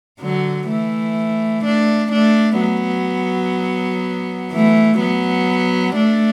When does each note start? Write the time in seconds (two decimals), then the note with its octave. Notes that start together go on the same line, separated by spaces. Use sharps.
0.20 D3 F#3
0.69 E3 A3
1.65 A3 D4
2.12 A3 D4
2.60 F#3 B3
4.52 E3 A3
5.00 F#3 B3
5.96 A3 D4